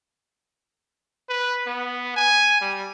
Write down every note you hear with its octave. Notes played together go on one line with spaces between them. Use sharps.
B4
B3
G#5
G3